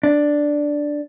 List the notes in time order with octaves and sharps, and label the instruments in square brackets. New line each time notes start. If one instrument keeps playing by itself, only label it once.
[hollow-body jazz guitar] D4